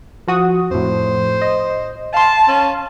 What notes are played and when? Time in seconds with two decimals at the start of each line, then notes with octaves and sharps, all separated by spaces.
0.28 F3 F#4 D#6
0.71 F2 A2 C5
1.42 D#5
2.14 F5 A5 C6
2.48 C#4